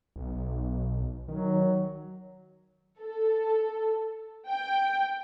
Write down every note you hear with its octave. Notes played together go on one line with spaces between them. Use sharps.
B1
D#3 F#3
A4
G5